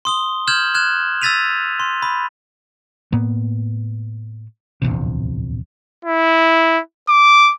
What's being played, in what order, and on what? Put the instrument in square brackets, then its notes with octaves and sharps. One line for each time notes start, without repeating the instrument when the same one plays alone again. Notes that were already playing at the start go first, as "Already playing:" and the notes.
[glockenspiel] C6 D#6 G7
F6 G6 G#6 E7 F#7
F6 F#6 G#6 E7
E6 G#6 A6 B6 D#7 F7
C6
B5
[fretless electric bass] A2 A#3 B3
D1 A#1 E2 C3
[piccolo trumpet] E4
D6